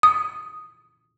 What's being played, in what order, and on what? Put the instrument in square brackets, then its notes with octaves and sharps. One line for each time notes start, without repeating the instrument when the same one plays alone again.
[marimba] D#6